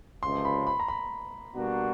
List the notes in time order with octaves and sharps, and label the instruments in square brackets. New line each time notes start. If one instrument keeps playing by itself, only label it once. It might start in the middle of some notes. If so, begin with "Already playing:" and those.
[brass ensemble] C#2 C3 F3 [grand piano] C6
[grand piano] B5
B5
A#5
B5
[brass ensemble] B2 G3 A#3 D4 F#4